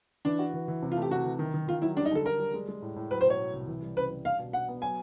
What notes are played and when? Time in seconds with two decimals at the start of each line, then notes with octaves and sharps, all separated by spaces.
0.25 E3 D4
0.39 F#4
0.54 E3
0.68 E3
0.83 C3
0.92 F4
0.97 A3 G4
1.11 C3 F#4
1.25 E3
1.39 D#3
1.54 D#3
1.68 D#3 F4
1.82 F#3 E4
1.96 G3 D4
2.05 D#4
2.11 D3 A4
2.25 D3 A#4
2.39 G3
2.54 G#3
2.69 G#3
2.82 A2
2.96 A2
3.11 F#3 B4
3.21 C5
3.25 B2 C#5
3.39 B2
3.53 C2
3.67 E3
3.82 G3
3.97 C#3 B4
4.11 G3
4.25 D4 F5
4.39 B2
4.53 D4 F#5
4.69 B3
4.82 F#3 G#5